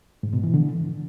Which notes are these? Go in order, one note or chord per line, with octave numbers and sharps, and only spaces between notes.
G#2
B2
E3
D3